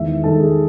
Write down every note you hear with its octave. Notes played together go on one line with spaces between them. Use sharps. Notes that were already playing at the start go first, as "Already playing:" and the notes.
Already playing: E2 D#3 G#3 E5
E2 D#3 G#3 A4
G#4